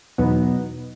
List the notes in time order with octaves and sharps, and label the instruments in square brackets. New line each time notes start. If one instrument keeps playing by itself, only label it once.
[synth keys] E2 B2 F#3 B3 D#4